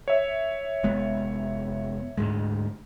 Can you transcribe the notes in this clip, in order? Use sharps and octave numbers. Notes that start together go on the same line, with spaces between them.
C#5 E5
F1 G#3 B3
D2 G#2 G#3